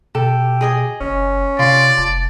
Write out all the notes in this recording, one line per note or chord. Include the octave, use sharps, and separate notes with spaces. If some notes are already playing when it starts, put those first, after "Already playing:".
B2 G4 A4
G#4 D#5 G#5
F#1 C#4
C3 F4 D5 C6
F1 A5